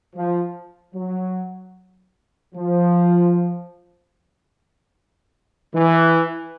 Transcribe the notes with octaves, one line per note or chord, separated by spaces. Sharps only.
F3
F#3
F3
E3